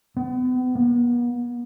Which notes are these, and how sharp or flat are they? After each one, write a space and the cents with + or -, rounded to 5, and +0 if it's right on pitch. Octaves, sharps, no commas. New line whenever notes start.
B3 +40
B3 -40